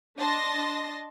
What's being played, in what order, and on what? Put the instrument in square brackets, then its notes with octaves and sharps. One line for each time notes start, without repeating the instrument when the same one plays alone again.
[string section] D4 D#5 A5 C6 A#6